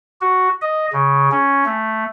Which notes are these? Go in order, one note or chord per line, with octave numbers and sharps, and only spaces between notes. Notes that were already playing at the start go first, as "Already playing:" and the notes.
F#4
D#5
C#3
C#4
A3